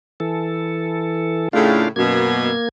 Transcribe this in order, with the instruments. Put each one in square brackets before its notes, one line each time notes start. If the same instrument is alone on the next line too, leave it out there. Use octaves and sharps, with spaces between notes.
[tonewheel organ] E3 A4
[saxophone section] A2 C#3 [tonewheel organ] D4 F4 F5
[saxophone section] F#2 B2 [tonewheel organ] A#3 G#6